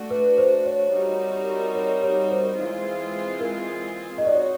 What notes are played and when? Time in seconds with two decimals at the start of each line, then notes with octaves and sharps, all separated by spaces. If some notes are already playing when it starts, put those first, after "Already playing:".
Already playing: A3 D4 F#4
0.11 B4
0.38 C5
0.66 C#5
0.92 G3 C4 D#4 F#4 A#4
1.75 C#5
2.03 C#5
2.31 C5
2.58 E3 G#3 C4 F4 G#4
3.40 A#4
4.18 D#5
4.23 C4 D#4 F#4 D5
4.35 C#5